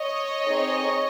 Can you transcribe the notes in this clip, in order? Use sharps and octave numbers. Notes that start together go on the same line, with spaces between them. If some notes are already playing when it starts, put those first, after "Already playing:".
Already playing: C#5 D#5
C4 D#4 G#4